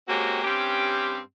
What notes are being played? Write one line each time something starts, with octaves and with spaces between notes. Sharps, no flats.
G#3 A#3 C4 C#4 F#4 G4
G2 C4 C#4 G4